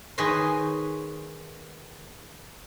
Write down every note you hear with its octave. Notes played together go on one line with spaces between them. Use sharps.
D#3 G#4 B4 C#5 D#5 C6